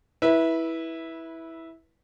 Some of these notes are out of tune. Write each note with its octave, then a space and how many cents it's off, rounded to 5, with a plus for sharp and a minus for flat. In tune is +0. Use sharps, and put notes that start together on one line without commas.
E4 -10 B4 -20